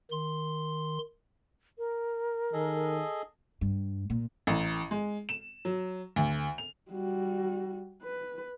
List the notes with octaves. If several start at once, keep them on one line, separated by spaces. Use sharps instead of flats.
D#3 C6
A#4
D#3 G#4 A4 D#5
G2
A#2
A1
G#3
E7
F#3
D2
F7
G3 F#4
B4